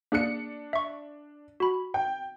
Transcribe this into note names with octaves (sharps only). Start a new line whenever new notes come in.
A#3 D4 G#4 F#6 C#7
E5 C#6
F#4 B5
G5